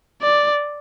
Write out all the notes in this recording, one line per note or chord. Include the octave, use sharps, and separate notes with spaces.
D5